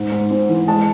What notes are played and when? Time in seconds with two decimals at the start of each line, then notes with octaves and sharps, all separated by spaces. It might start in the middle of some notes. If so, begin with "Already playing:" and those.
Already playing: G#2
0.12 G#2
0.31 C4
0.49 E3
0.68 G#3 A5